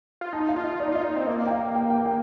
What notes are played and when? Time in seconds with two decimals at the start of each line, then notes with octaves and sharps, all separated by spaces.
0.21 F4
0.33 D#4 A5
0.49 F5
0.56 F4
0.64 D#5
0.80 D#4 D5
0.92 F4 D#5
1.04 D#4 D5
1.16 C4
1.27 A#3 D#5
1.46 G5
1.51 F5
1.75 G5
1.90 G5
2.06 G5